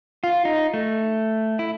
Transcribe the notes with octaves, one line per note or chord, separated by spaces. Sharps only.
F4
D#4
A3
E4